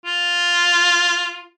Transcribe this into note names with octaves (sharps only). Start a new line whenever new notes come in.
F4